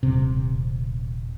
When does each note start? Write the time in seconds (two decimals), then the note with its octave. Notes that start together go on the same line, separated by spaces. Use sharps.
0.03 D#1 C3